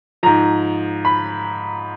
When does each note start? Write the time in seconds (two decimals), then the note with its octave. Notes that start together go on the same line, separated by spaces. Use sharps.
0.23 G#2 F3 A#5
1.05 B5